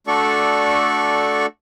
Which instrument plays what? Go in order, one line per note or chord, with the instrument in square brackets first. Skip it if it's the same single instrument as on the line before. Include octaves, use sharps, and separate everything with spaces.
[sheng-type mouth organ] A3 D4 F#4 A4 D5 C#6